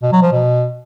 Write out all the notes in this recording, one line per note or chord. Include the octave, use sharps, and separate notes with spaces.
B2
F#3
F3
B2